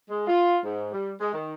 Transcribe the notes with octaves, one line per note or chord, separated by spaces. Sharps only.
G#3
F4
G#2
G3
G#3
D#3